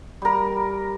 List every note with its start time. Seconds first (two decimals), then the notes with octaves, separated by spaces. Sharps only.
0.22 G3 A#4